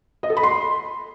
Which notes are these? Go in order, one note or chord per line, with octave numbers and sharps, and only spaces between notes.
D#5
A4
B5
C6